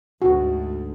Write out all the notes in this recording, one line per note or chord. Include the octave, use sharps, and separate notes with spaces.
D2 G#2 F#4